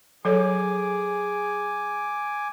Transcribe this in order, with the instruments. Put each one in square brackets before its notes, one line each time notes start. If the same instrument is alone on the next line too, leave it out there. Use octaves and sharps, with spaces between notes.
[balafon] F#3 A4 C#5 [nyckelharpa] G#4 [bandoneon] G#5 D6